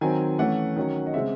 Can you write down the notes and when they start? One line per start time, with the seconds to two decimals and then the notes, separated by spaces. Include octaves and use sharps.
0.01 D#3 F#3 C4 G#5
0.39 E3 A3 C#4 F#5
0.76 D#3 F#3 C#4
1.07 D#5
1.14 C#3 G#3 C4 E5